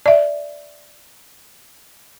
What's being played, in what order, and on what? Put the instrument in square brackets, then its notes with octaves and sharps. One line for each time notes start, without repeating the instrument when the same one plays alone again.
[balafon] D5 E5